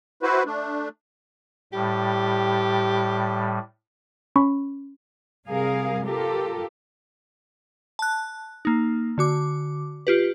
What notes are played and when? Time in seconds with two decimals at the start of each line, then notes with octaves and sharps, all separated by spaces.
0.23 E4 F#4 B4 C5
0.46 A3 D4
1.73 A2 G3 G4
4.36 C#4 B5 C#6
5.46 C3 G3 G#4 A#4 F5
6.06 F4 G4 A4 A#4
7.99 A5 F#6
8.65 A#3 D#4
9.18 D3 F#4 D6
10.07 F4 G4 B4